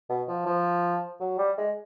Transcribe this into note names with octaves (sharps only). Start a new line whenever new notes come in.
B2
F3
F3
F#3
G3
G#3